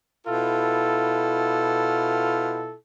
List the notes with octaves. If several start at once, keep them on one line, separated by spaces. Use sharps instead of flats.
B2 E4 F4 A4